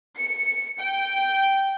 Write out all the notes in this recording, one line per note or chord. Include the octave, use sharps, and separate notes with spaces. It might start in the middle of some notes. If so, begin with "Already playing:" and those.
C#7
G5